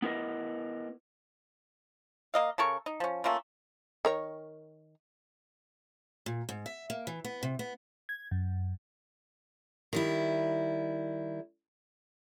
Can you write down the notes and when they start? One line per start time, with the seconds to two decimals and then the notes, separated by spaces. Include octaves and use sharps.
0.02 B3 E4 A#4 B4 D#5
2.34 A#3 D#5 F5
2.58 C#3 A4 A#4 C#6
2.86 D#4
3.00 F3 C#4
3.24 A3 A#3 C#4 F4
4.05 D#3 A#4 C#5
6.26 A#2
6.49 G#2
6.66 E5
6.90 A#3
7.07 E3
7.24 B3
7.43 C3
7.59 B3
8.09 G#6
8.31 F#2
9.93 D#3 G3 E4